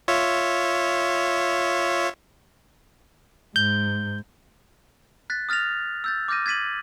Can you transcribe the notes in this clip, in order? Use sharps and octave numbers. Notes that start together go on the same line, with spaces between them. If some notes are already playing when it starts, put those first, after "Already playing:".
F4 C#5 E5
G#2 G6
F#6 A6 B6
D#6 F6 A6 A#6 F7
E6 G6 A6
D6 F6 G6 A#6 D#7
G#6 A6 B6 D#7 F#7